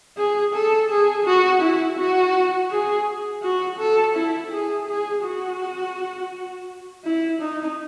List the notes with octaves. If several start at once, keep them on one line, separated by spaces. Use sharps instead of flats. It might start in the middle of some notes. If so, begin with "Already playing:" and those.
G#4
A4
G#4
F#4
E4
F#4
G#4
F#4
A4
E4
G#4
G#4
F#4
E4
D#4